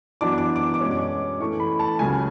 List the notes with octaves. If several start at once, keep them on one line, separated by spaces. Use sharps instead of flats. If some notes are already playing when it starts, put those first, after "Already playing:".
F#2 E3 B3 D4 D6
D6
D6
D6
B2 G#3 C#4
D6
A2 E3 A3 C#6
B5
A5
C#2 C#3 F#3 G#5